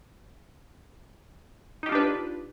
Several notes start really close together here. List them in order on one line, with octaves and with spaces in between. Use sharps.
D#4 G4 F4 D4 B4